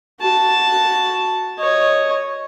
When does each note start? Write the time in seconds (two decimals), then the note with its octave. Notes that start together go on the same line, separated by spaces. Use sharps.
0.20 F#4 A5
1.58 C#5 D#5